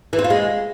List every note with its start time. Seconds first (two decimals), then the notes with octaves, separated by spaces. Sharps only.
0.13 E3
0.19 C4
0.24 F4
0.30 G#3